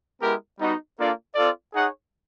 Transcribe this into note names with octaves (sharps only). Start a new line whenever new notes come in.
G#3 B3 E4 G4 A#4
G3 B3 D#4 F#4
A#3 D4 F4 A4 D5
C4 F4 A4 D5
D#4 G#4 C#5 F#5